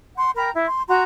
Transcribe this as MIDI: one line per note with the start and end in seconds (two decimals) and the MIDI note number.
0.17 0.31 78
0.17 0.31 84
0.36 0.50 70
0.36 0.50 79
0.36 0.50 82
0.36 0.50 83
0.55 0.66 64
0.68 0.83 84
0.89 1.03 66
0.89 1.03 82
0.89 1.03 84